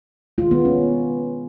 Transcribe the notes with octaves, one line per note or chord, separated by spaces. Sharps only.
D#3 G#3 F4
B3
C#4